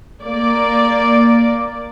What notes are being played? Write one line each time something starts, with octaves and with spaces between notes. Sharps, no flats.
A#3 D5